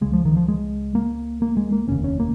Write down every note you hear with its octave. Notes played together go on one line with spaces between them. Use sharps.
C#2 C#3 G#3
F3
D#3
F3
G#3
A#3
A#3
G#3
A#3
F1 D#2 C#3 C#4
C#4
A#3